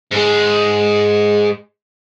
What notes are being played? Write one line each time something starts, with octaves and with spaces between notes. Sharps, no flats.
G#2 G#3